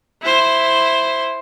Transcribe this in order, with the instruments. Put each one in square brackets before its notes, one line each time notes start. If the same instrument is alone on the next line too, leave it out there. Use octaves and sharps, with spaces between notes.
[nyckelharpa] E4 C5